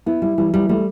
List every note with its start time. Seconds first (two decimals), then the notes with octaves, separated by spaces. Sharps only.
0.06 B3 E4
0.22 G3 E4
0.38 E3 G3
0.54 E3 G3
0.69 G3 A3